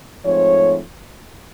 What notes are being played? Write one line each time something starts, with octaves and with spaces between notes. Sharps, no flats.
G#2 F3 A3 C4 C#5